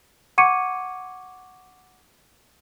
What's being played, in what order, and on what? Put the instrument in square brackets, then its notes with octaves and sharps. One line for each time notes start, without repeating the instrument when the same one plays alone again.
[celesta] F#5 C#6 D6 G#6 C#7 D#7